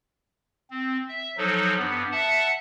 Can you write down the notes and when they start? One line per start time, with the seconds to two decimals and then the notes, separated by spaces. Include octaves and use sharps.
0.70 C4
1.08 E5
1.38 F3 F#3 D#4 A4
1.77 G2 B3
2.12 E5 F#5 A5